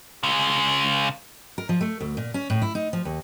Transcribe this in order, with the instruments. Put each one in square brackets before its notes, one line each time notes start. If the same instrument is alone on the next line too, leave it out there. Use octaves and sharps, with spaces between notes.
[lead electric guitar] C#3 G#3
[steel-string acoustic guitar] A#4
F3
A3
D2
A#2
C#4
A2
E4
D#4
F3
D#2